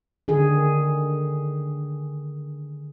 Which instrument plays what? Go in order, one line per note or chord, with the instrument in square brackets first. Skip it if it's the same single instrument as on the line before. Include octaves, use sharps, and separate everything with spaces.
[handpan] D3 D#3 G#4